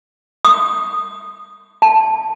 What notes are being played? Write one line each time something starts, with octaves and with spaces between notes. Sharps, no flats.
D#6
A5